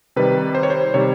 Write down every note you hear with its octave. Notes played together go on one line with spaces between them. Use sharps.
C3 D#3 G3 B4
C5
C#5
C5
C3 D#3 G3 C#5